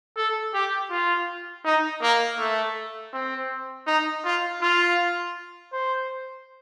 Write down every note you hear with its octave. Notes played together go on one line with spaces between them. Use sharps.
A4
G4
F4
D#4
A#3
A3
C4
D#4
F4
F4
C5